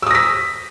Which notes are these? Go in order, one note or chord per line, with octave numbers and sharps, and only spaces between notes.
D#6 E6 A#6 B6